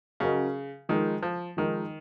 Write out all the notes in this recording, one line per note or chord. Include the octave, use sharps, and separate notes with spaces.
C#3 F#3 C#4 F#4 A#4 D#5
D#3 F3 G#3 D#4 A#4
F3
D#3 F3 G#3 D#4 A#4